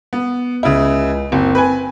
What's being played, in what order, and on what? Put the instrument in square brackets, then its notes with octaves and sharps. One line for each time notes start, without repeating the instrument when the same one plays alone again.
[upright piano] B3
[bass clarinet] C#2 [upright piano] C#3 E4
[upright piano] F#1 [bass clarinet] C4
[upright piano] B4 G#5